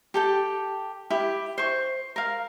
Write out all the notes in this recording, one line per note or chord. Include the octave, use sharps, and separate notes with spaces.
G4 A4 G5
E4 G4
C5 C#6
A#4 F5